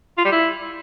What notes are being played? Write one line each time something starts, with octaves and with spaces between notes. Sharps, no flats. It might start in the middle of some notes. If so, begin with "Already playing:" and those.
F4
G3
E4